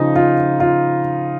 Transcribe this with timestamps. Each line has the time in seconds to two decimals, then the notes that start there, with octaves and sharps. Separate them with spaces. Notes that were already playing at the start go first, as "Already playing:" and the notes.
Already playing: C#3 F3 D#4
0.16 F4
0.60 F4